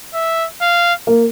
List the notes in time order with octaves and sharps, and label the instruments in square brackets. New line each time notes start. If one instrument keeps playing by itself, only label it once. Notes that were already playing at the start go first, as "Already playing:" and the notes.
[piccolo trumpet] E5
F5
[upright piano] A#3